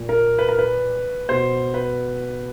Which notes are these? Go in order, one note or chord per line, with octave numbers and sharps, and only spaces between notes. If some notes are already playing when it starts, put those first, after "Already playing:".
Already playing: A#2
A#4
B4
A#4
B4
B2 C5
B4